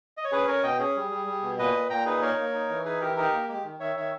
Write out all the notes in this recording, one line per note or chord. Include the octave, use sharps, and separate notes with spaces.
D#5
C#5
C#4 G#4 B4
C#4 A#4 C#5
B2 D#5 G5
C#4 G#4
G3
G3
G3
B2
A#2 B4 D#5
A#2
A#2 G5 A#5
D#4 G#4 B4
A#3 A#4 C#5
A#3
D#4
E3
D#4 G#4 B4
E3 G4 A#4
D#4 G4 A#4
A#3
G#3 G4
D#3
D#3 C#5 E5
D#3 C#5 E5